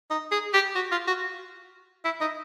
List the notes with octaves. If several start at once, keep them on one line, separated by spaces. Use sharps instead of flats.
D#4
G#4
G4
F#4
F4
F#4
E4
D#4